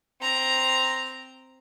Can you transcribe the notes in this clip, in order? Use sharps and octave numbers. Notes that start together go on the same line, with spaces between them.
C4 A#5